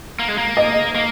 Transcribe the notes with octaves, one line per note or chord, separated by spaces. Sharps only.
A#3
G#3
A#3
D#5
A#3